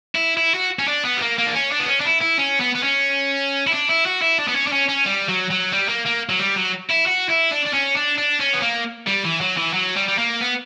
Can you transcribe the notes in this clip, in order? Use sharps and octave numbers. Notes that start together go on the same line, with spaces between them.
E4
E4
F#4
C#4
D4
B3
G3
A#3
A#3
D4
C#4
D4
B3
C#4
D4
E4
E4
C#4
B3
B3
C#4
E4
D4
E4
F#4
E4
D4
B3
C#4
D4
C#4
C#4
G3
F#3
F#3
G3
A#3
A#3
F#3
G3
F#3
E4
F#4
E4
D4
D4
C#4
D4
D4
C#4
B3
A#3
G3
E3
F#3
E3
F#3
G3
G3
A#3
B3